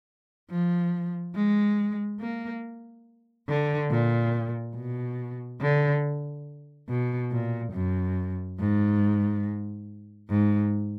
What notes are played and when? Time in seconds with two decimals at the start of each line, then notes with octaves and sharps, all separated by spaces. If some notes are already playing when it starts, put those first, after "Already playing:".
0.51 F3
1.35 G#3
2.20 A#3
3.48 D3
3.91 A#2
4.75 B2
5.61 D3
6.89 B2
7.32 A#2
7.73 F#2
8.59 G#2
10.30 G#2